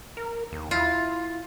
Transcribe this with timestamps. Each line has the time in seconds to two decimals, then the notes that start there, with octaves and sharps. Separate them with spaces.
0.17 A#4
0.52 D#2
0.71 E4 F4